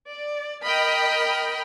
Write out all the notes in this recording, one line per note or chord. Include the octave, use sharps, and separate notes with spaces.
D5
A#4 D#5 G5 B5 F6